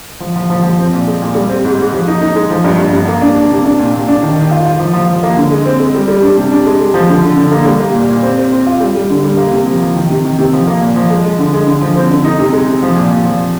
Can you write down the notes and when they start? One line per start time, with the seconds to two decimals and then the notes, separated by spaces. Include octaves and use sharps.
0.20 F3
0.36 F3
0.50 F3
0.63 F3
0.79 C4
0.93 A#2
1.07 G#3
1.22 A#2
1.35 G3
1.50 C4
1.65 G#2
1.78 G#2
1.92 F3
2.08 D#4
2.21 D#4
2.36 G#3
2.50 F3
2.64 G2
2.79 G2
2.93 G2
3.08 A#3
3.21 D4
3.36 D4
3.51 C3
3.64 D4
3.79 A#2
3.93 A#2
4.08 D4
4.23 D#3
4.36 D#3
4.51 F4
4.66 F4
4.79 F3
4.93 F3
5.07 F3
5.23 A#3
5.37 D3
5.51 G#3
5.66 C4
5.80 G#3
5.95 G3
6.08 G3
6.22 D4
6.37 C3
6.51 D4
6.66 G#3
6.81 G#3
6.94 F3
7.09 D3
7.22 D3
7.37 D3
7.52 A#3
7.65 G3
7.80 A#3
7.94 A#2
8.10 A#2
8.23 C4
8.38 C4
8.52 C4
8.67 F4
8.80 G3
8.95 G3
9.10 D3
9.24 G3
9.37 A#3
9.52 C3
9.67 F3
9.81 F3
9.96 D#3
10.10 C3
10.24 D#3
10.38 C3
10.53 F3
10.67 A#3
10.81 A#2
10.96 F3
11.10 G#3
11.24 G#3
11.39 D3
11.53 G#3
11.67 D3
11.81 F3
11.96 C4
12.11 D3
12.24 D#4
12.39 C3
12.53 G#3
12.67 C3
12.82 F3
12.96 A#2
13.11 A#2
13.25 F3